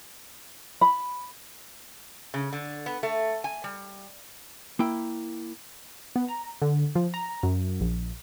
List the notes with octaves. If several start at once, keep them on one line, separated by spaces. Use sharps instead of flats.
B5
C#3
D3
B3
A3
G#5
G3
A#3 E4 G5
B3
A#5
D3
F3
A#5
F#2
A#1